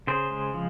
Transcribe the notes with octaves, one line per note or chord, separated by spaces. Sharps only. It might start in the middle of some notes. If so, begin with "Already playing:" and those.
C#3 G#4 C5
G#3
F3